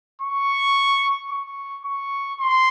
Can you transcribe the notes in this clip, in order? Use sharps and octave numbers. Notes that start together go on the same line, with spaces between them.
C#6
C#6
C#6
C6